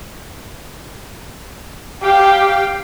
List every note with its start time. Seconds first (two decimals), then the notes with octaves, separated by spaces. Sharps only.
2.03 G4 F5 G5